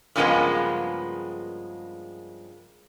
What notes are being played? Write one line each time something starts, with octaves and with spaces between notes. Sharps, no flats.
G2 C#3 F3 G#3 A#3 B3